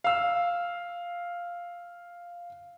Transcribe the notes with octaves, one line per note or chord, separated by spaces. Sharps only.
F5 E6